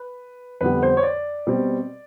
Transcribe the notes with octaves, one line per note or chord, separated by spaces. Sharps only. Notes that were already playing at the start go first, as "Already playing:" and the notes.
Already playing: B4
F2 D3 G3 B3 B4
C5
C#5
D5
B2 G3 C4